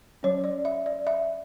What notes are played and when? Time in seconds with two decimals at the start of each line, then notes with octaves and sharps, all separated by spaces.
0.23 F#3 C#4 C#5
0.44 D5
0.65 E5
0.86 D5
1.07 E5